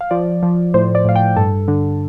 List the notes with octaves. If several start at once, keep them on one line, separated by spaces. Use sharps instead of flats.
F5
F3 D5
F3
A2 C5
D5
A2 F5
G5
G2 A4
D3